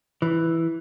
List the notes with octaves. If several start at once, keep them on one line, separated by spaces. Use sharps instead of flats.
E3